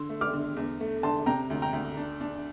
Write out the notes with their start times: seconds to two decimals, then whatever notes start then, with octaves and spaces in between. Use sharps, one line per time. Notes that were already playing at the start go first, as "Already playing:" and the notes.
Already playing: D3 C6 E6
0.09 A3
0.21 D6 F6
0.33 D3
0.56 E2
0.80 A3
1.03 D3 A5 C6
1.26 C3 G5 A#5
1.50 D2
1.62 G5 A#5
1.73 D2
1.97 D4
2.21 D4